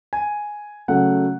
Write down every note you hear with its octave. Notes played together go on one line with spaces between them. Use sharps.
G#5
C#3 F#3 A3 F#5